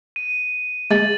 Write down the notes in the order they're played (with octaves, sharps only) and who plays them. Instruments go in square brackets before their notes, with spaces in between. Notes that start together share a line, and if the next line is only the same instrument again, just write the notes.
[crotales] D#7
[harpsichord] G#3 [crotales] A6 F#7